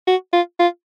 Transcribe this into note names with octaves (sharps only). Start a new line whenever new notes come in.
F#4
F4
F4